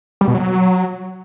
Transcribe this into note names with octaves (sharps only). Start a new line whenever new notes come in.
G3
B2
F#3